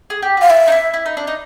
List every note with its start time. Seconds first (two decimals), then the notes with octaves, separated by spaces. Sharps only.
0.10 G#4
0.22 G4
0.37 F#4 F5
0.50 F4 E5
0.68 D#4
0.72 E4
0.94 E4
1.06 D#4
1.17 D4
1.27 D#4